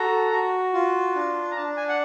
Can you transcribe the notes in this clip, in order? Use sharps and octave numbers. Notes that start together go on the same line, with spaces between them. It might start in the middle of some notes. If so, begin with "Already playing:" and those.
Already playing: F#4 A4 A#5
F#4
F4
D4
A#5
D4 A5
G#5
F#5